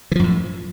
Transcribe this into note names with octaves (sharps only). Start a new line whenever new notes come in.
F#2 A2 E3 F3